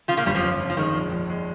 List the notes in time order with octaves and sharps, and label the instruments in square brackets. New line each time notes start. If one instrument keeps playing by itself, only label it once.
[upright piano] C#3 [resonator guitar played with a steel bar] F3 F4
[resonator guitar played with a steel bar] A#2 A#3
[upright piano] G1 [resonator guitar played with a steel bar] G2 G3
[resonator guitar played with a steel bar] F2 F3
[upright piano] G1
F2
[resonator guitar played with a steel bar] F3
[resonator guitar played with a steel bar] D#3 [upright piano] G#3
[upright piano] A#1
A#1
G#3